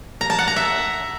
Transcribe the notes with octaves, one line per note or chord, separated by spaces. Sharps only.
A#5
A5
F#5
A#5
E5